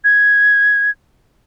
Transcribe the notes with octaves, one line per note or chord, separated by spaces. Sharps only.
G#6